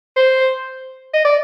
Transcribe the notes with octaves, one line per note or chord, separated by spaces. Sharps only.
C5
D#5
D5